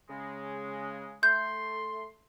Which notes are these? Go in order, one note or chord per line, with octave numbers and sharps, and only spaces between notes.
C#3 G#3
A3 C6 G6